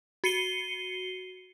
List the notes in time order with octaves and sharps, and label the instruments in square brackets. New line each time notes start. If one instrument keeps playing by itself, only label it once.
[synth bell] F#4 C7 C#7 D#7 G7